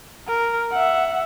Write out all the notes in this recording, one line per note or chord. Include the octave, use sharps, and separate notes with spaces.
A#4
E5 F#5